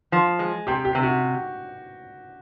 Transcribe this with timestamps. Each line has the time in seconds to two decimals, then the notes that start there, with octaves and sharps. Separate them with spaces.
0.12 F3
0.39 G#3
0.67 C3 G4
0.85 G4
0.95 C3
1.03 F#4